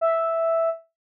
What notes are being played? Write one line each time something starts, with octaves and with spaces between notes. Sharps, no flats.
E5